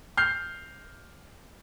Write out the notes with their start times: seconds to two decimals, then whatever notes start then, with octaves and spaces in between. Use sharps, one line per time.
0.17 F6 G6 C7